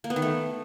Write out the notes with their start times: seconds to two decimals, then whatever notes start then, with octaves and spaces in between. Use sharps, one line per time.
0.04 A#3
0.10 B3
0.16 D#3
0.22 A3